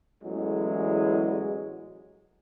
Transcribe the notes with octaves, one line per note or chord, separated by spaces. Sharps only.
A1 E2 F#3 G#3